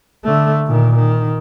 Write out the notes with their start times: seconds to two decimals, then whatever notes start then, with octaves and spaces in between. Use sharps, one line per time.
0.24 D3 A3
0.67 A#2 D#3
0.96 D#3